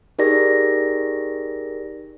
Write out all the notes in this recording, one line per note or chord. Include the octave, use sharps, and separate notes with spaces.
D#4 G4 G#4 A#4 D5 A#6